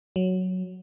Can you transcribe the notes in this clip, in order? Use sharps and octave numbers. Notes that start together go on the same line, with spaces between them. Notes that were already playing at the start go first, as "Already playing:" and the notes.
F#3